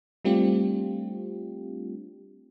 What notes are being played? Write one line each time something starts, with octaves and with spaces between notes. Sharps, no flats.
G3 A3 C4 D4 F4 G4